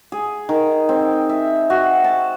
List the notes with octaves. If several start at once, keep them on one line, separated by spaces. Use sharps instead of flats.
G#4
D#3
C4
E5
F#4
A5